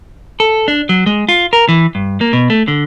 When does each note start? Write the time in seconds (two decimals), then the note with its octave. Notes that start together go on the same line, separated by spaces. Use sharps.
0.40 A4
0.68 D4
0.89 F#3
1.06 G#3
1.29 F4
1.53 A#4
1.69 E3
1.95 G2
2.21 A#3
2.33 B2
2.50 A3
2.68 D3